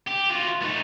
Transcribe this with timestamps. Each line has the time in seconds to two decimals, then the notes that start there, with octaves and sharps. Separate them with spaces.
0.08 G4
0.30 F4 F#4
0.62 A3 D#4